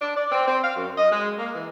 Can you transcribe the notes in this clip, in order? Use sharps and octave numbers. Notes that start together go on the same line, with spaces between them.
D4
D5
C4
C4
F5
F#2
D#5
G#3
A#3
E3